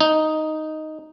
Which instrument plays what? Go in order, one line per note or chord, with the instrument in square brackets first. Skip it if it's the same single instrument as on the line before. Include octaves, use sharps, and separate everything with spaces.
[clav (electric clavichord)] D#4